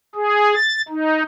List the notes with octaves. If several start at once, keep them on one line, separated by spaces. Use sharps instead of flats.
G#4
A6
D#4